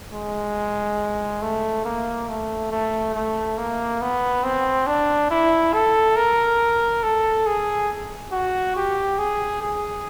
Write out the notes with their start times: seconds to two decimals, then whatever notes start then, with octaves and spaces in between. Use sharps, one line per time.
0.12 G#3
1.42 A3
1.85 A#3
2.29 A3
2.72 A3
3.14 A3
3.58 A#3
4.01 B3
4.44 C4
4.87 D4
5.30 E4
5.73 A4
6.16 A#4
7.03 A4
7.46 G#4
8.32 F#4
8.76 G4
9.18 G#4
9.62 G#4